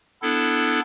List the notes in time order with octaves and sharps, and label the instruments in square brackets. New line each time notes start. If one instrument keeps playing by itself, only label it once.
[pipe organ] B3 D4 E4 A4